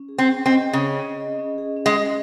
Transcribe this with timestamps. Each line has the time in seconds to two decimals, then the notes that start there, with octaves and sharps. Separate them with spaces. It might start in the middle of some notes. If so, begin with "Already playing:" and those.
Already playing: C#4
0.09 G#4
0.18 C4
0.27 C#4
0.46 C4 D#5
0.65 C#4
0.73 C#3
0.83 G#4
1.02 C#4
1.20 D#5
1.39 C#4
1.58 G#4
1.76 C#4
1.86 G#3
1.95 D#5